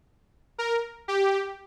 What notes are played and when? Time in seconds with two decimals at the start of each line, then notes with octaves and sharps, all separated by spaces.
0.58 A#4
1.08 G4